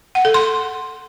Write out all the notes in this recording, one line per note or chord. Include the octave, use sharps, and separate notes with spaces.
F#5
A4
C6